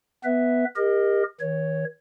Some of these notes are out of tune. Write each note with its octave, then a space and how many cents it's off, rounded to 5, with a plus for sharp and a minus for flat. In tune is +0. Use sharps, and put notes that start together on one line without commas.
B3 +5 B4 +0 E5 +0
G4 +35 A#4 +10 D#5 -5
D#3 +45 C#5 +0